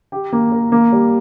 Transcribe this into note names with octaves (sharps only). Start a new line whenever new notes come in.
G4
A#3
A#4
A#3
G3